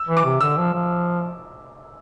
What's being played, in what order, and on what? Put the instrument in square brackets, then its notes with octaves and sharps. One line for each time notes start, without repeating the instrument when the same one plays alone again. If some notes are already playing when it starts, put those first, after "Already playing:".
Already playing: [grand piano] E6
[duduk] E3
[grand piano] D6
[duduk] C3
[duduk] D3 [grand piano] E6
[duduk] F3
F3